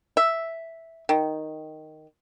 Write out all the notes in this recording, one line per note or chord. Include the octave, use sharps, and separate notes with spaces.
E5
D#3